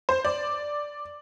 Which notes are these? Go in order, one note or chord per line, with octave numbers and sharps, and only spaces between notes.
C5
D5